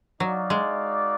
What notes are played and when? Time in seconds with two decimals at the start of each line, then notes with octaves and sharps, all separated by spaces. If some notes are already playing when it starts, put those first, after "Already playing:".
0.20 F#3 D#4 F#4 D5 F5
0.50 G#3